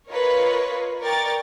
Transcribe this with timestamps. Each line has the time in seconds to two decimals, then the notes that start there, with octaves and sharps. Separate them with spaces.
0.10 F4 A#4 B4 C#5 D#5
1.01 A#4 D5 G5 A#5 C#6 A6